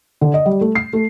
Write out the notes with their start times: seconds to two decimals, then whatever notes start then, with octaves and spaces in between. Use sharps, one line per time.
0.21 D3
0.34 D#5
0.46 G3
0.61 A3
0.75 C7
0.93 A3